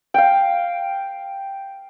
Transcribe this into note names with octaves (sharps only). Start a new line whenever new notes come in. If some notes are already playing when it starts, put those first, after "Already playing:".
F5 G5